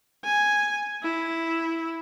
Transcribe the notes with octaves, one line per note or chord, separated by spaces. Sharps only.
G#5
E4